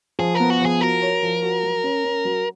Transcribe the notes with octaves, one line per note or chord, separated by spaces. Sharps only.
F3 G#4
A#4
B3
F#4
F3
G#4
F#4 A#4
C#5
F3
F#4
F#3
C#4
C#4
F#3